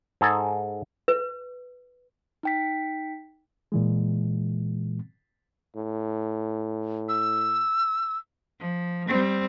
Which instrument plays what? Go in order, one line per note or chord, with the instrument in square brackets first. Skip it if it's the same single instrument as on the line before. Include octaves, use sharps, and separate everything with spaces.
[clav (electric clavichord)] G#2 G#4 A4 A#5
[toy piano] B4
[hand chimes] D#4 G5 B6
[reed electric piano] A#2 E3 G#3
[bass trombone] A2
[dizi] E6
[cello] F3
G3 C4